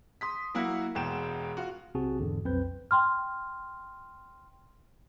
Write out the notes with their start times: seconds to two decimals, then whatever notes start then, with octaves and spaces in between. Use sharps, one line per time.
0.21 C6 D#6 B6
0.54 F#3 A#3 E4 F#4 F#5
0.95 E1 B2 G#3 G5 E7
1.57 F4 F#4
1.95 B1 C3 C4 F#4 G#4 A5
2.19 E2 G#2 D3
2.44 B1 F2 C4 B4 G6
2.91 G5 C6 F6